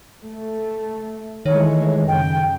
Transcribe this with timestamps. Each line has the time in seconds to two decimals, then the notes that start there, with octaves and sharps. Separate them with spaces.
0.24 A3
1.46 D#3 E3 G#3 A3 C#5
2.08 F#2 C#3 G5